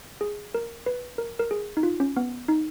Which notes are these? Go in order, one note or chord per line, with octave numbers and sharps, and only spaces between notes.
G#4
A#4
B4
A#4
A#4
G#4
D#4
F4
C#4
B3
D#4